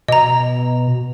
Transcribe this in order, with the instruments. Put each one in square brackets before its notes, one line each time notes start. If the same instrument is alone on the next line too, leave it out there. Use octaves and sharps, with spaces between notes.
[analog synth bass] B2 [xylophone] D#5 A#5